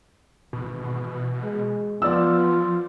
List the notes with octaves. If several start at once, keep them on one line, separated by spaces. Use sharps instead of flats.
G#1 B2 E3
G#3
F3 B3 F4 D5 E6